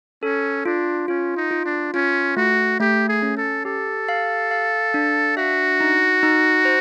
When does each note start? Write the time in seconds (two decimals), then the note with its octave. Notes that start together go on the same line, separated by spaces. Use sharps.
0.23 C#4 A4
0.65 D4 F4
1.08 C#4 F4
1.36 D#4
1.51 F4
1.66 D4
1.94 C#4 F4
2.37 A3 F#4
2.80 A3 G4
3.08 G#4
3.22 C#4
3.37 A4
3.65 G4 A4
4.09 F5
4.51 F5
4.94 D4
5.37 F#4 E5
5.80 D#4
6.23 D#4
6.65 C5